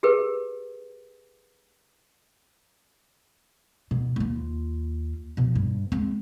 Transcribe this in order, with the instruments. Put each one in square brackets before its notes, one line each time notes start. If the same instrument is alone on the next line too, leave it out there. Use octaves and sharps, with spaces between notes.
[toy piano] G4 G#4 A#4 B4
[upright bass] B2
D#2 F4
B2 F3
G2
G#3 C4